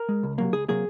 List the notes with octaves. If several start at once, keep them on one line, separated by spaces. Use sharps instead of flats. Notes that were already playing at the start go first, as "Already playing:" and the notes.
Already playing: A#4
G#3
C#2
C3 F#3 A#3
C#2 G#4
C3 F#3 A#3 G#4